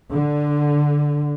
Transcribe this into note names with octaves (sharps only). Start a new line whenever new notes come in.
D3